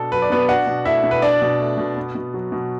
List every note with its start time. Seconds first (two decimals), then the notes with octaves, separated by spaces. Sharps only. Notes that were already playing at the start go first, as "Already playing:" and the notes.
Already playing: B2 D4 A4
0.12 F#3 B4
0.22 D5
0.30 B2 B3 B4
0.49 D4 F#4 F#5
0.67 B2
0.85 A3 E4 E5
1.04 B2
1.11 B4
1.22 D4 D5
1.42 B2
1.60 A3
1.78 B2
1.96 B3
2.15 B2
2.34 F#3
2.52 B2